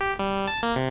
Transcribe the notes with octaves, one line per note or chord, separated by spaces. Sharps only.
G4
G3
A5
A#3
C3